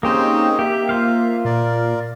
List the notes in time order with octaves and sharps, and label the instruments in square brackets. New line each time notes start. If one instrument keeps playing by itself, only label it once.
[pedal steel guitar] A#3 G4 C5 [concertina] C4 C#4 G#4 [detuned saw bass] D#4
[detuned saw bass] A#3 [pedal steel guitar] G4 [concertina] E5
[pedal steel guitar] F4 C5 F5
[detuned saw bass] A#2 [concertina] A#4 D5